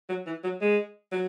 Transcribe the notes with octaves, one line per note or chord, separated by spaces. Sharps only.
F#3
E3
F#3
G#3
F#3